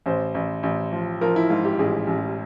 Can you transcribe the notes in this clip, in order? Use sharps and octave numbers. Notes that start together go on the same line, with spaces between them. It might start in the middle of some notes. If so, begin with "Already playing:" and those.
A1 C5
A1
A1
F3
F3 A#4
E4
G#2 F4
G4
A1 G#4
A1